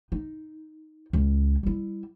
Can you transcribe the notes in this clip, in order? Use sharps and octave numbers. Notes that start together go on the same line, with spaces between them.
D#4
C#2 C#4
G3 E4